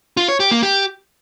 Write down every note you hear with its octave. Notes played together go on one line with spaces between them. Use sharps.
F4
C#5
G4
A#3
G4